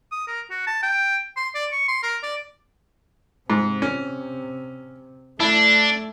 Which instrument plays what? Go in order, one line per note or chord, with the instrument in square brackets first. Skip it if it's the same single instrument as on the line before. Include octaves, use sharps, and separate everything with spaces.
[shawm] D#6
A#4
F#4
A5
G5
C6
D5
C#6
C6
A#4
D5
[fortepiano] G#2 [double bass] C3
[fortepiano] C#4
[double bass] A3 [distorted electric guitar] D4 [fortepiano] E4